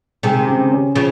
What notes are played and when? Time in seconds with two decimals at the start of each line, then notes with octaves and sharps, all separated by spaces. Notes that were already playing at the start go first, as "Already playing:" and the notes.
0.23 C3 D#3 G#3
0.47 C#3
0.72 C#4
0.96 C#3 F3